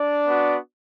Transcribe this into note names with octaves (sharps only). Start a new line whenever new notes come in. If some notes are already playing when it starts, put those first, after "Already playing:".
Already playing: D4 D5
B3 F#4